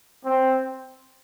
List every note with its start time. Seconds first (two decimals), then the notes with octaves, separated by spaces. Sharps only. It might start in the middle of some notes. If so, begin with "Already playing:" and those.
0.25 C4